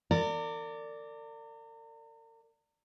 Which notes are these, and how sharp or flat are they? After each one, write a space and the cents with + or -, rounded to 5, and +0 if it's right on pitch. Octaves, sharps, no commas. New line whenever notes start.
A#4 -40 D5 +0